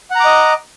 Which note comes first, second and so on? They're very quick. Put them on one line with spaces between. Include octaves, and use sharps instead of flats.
F#5 A#5 D6 D#5